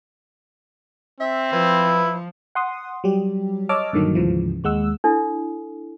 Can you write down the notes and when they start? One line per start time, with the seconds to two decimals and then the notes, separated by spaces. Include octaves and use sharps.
1.20 C4 E5
1.53 F3 E4 B4
2.55 F#5 C6 D#6
3.04 F#3 G3 G4
3.69 C#5 D#5 A5 D6 E6 F6
3.93 G2 A#2 D3 D#3 F#3
4.15 D2 G#2 C#3 E3 F3
4.64 D#2 G#3 F#5 E6
5.04 D4 E4 A4